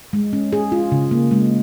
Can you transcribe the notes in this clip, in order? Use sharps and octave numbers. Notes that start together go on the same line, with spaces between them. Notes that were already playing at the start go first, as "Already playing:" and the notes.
G#3
C#4
G#4
F4
C#3
A#3
G#3